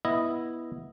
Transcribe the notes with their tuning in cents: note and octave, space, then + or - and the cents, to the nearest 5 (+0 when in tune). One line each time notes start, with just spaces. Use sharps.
B3 -10 E4 +0 D#5 +0